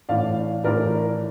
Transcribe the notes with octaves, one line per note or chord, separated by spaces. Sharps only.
A2 E3 D5 F5
A2 E3 A#4 D5